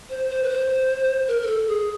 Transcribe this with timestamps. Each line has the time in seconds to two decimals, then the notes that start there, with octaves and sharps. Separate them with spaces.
0.10 C5
0.29 C5
0.43 B4
0.49 C5
1.28 A#4
1.42 A#4
1.47 A4
1.68 G#4